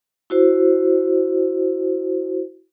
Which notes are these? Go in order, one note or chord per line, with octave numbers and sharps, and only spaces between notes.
E4 F#4 C5